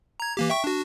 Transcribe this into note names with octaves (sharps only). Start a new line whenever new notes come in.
A#5 G#6
E3 A#3 G4
E5 G5 C#6
D4 F#4